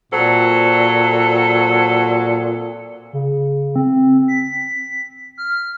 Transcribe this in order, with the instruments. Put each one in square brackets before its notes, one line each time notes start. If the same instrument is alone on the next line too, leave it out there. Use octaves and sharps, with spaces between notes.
[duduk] A#2 [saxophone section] F#3 C4 A4
[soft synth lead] C#3
C4
B6
F6